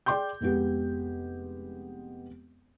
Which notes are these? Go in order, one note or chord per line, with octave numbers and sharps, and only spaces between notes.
G#4 D5 G5 C6 D6 G6
F1 G#3 B3 G4